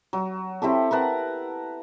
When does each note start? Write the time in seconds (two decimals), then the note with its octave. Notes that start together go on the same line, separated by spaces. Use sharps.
0.13 F#3
0.62 C4 E4 G4 A4
0.91 A#4 B4 F#5 A5